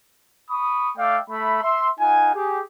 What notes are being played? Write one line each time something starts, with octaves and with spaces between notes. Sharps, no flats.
B5 C#6 D#6
A3 D5 E5 F5 G5
A3 E5 B5
E5 C6
D#4 F4 F#5 G#5
G4 G#4